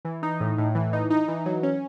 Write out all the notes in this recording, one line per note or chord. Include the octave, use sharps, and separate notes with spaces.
E3
D#4
A2
A2
E3
D#4
D#4
E3
F#3
C#4